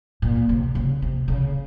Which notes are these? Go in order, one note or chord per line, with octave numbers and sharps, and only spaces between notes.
A#2
C3
C#3
C3
C#3